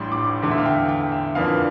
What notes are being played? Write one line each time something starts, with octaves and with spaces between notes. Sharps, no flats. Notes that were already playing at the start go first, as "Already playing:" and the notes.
Already playing: A1 A2 G3 D4 C6
D6
E2 D3 A3
E5
F5
G5
G5
E5
G1 F2 E3 A#3 D4 F5